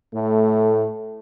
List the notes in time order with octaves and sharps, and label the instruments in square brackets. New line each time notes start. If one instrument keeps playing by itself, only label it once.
[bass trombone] A2 [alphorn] A3